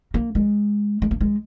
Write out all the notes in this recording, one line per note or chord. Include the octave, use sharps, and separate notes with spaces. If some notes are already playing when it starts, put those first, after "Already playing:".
A#3
G#3
G#3
A#3
G#3